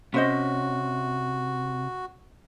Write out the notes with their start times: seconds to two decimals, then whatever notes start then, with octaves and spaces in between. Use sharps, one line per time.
0.14 C3 C#4 F#4 C5 D#5